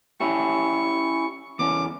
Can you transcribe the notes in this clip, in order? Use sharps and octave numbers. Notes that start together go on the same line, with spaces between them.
C#4 E4 G4 C#6
E2 C#4 D6